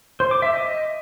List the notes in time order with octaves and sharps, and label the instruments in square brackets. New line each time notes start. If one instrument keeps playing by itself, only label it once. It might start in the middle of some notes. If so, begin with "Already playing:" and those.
[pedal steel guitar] C5
D6
E5
D#5